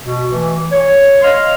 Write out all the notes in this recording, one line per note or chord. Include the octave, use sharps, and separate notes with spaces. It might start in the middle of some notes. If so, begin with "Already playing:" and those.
B2
E3 A3
C#5
D#5 F5 C6 F6